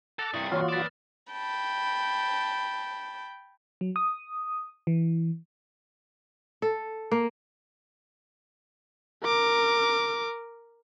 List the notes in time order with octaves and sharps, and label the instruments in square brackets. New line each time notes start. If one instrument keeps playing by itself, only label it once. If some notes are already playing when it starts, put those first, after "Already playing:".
[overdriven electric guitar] A4 [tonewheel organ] F#5 A#5 D6 [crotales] A6
[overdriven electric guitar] G2 C3 [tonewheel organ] E4 C#6 [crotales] D#6
[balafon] E3 A#3 C#5 [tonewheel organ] F4 F#4 [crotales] F6
[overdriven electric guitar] B4 D5 [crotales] A6 E7
[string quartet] G5 A5 B5
[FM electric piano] F#3
D#6
E3
[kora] A4
A#3
[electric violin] A#4 D6